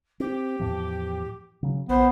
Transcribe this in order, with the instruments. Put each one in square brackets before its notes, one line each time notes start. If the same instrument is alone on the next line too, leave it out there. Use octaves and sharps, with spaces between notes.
[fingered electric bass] C4 [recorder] G4
[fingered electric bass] E2 A2 F3
C#3 F#3
[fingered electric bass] A#1 [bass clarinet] B3 [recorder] C5